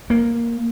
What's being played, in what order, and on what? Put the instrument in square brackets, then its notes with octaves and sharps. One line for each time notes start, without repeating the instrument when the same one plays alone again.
[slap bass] A#3